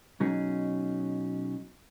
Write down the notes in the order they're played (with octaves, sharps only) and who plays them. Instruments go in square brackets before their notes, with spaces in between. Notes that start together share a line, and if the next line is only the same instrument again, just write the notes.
[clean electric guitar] B2 F#3 C#4 D#4 G#4